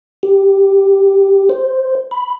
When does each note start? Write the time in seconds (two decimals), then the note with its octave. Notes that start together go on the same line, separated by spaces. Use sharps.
0.23 G4
1.49 C5
2.11 B5